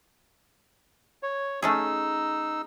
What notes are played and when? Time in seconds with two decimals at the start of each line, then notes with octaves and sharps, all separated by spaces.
1.23 C#5
1.62 A3 C#4 D#4 G#4 E6